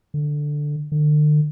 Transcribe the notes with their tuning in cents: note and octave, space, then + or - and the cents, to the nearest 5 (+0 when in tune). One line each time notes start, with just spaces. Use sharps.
D3 +5
D3 +40